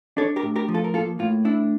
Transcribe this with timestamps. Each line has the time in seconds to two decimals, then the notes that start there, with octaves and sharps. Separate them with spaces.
0.17 D4 A4 C#5
0.36 G4 A#4
0.42 A2
0.56 G4 A#4
0.68 F3
0.74 F4 A4
0.84 A#4
0.94 A#3 F4 A4
1.19 A2 F4
1.45 D4 E4